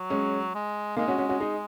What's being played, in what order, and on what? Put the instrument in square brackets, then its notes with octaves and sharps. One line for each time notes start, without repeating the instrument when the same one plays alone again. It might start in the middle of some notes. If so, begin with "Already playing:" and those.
Already playing: [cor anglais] F#3
[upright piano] G#3 C#4
[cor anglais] G#3
[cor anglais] G#3 [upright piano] A#3 D#4
[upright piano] C#4 F#4
C#4 F#4
C#4 F#4
D#4 G#4